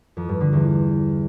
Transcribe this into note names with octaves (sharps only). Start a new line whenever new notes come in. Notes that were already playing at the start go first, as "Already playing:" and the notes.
F2
G2
D3
E2